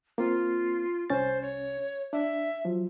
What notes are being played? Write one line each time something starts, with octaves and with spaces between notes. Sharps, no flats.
A#3 C4 F4
C2 C#4 C5 A6
C#5
D4 E5
F3 F#3